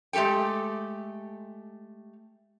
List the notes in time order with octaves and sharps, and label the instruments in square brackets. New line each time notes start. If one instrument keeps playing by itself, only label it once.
[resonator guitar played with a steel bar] G#3 A3 G4 A4 G5